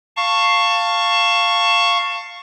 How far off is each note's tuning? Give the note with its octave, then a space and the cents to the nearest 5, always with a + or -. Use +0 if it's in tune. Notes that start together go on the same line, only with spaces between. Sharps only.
F5 +0 A5 +20 C#6 -5